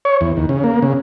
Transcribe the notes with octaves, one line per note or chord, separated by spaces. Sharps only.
C#5
E2
D#2
C#3
A#3
C#3